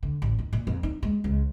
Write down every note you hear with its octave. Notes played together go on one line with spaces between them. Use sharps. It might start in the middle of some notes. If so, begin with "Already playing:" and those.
D3
A1
D#3
A#2
F2
D#4
G#3
C#2